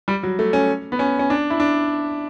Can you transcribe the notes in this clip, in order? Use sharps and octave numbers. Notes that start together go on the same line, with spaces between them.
G3
F#3
A3
C#4
B3
C#4
C#4
D4
E4
D4